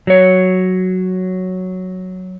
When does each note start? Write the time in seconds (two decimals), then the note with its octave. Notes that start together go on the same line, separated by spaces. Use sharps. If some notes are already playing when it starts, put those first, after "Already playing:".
0.07 F#3 C#5